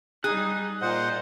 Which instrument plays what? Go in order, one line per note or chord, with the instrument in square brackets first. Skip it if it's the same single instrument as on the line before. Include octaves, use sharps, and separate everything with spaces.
[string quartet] G3 D#4 [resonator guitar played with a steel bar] G#4 [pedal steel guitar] F#6
[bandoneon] A#2 C5 F#5 [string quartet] F4 D#5